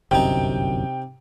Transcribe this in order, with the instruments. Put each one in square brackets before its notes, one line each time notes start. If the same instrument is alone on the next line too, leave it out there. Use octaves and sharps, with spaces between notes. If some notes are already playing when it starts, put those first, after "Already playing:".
[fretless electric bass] G1 C2 F#2 [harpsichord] C3 D#4 [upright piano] G5